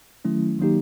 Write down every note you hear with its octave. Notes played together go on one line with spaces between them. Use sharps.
D#3 F#3 A3 C#4 E4
D#3 F#3 A#3 D#4 G4